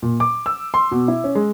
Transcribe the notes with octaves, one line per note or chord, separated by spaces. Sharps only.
A#2
D6
E6
C6
B2
E4
C#4
G#3